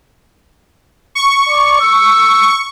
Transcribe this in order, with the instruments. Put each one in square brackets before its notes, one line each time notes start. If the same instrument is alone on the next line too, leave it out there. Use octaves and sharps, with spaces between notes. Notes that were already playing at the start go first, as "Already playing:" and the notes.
[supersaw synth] C#6
[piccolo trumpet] D5
E6